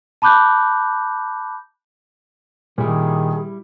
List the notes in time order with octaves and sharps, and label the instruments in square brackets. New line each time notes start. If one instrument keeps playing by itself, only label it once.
[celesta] A5 B5 D6 F#6 G6
[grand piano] A#2 [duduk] D#3 [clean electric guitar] G3 E4 [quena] G#4